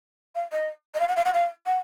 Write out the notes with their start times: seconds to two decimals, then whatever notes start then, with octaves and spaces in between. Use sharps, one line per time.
0.35 F5
0.52 D#5
0.94 D#5
1.00 F5
1.08 F#5
1.16 F5
1.25 F#5
1.33 F5
1.66 F#5